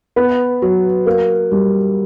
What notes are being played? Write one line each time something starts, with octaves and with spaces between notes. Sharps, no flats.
B3
F#3
A#3
G3